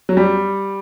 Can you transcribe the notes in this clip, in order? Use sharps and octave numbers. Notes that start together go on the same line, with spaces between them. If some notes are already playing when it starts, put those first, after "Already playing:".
F#3
G3